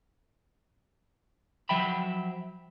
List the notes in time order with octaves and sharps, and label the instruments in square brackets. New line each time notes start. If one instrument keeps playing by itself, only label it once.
[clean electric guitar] F3 F#3 E5 G5 B5